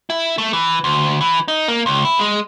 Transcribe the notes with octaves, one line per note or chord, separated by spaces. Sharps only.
E4
A3
E3
D2
E3
D#4
A#3
C#2
E4
G#3